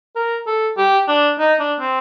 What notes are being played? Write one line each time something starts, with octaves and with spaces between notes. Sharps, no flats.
A#4
A4
G4
D4
D#4
D4
C4